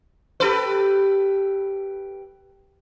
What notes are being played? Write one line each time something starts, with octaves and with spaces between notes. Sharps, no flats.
G4 A4 B4